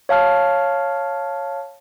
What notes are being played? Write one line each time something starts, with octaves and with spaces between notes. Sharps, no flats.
C#5 F5 A5 F6